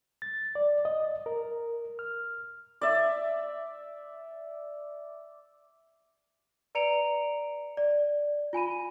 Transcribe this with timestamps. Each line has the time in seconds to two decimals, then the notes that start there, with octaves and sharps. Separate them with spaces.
0.22 A6
0.55 D5
0.85 D#5
1.26 A#4
1.99 F6
2.81 D5 E5
6.75 B4 D5 A#5 C#7 D7 F7
7.77 D5
8.53 F4 G#5 B5 D#7